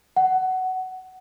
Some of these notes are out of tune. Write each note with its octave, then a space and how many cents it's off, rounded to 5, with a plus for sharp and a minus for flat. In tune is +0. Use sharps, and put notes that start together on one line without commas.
F#5 +15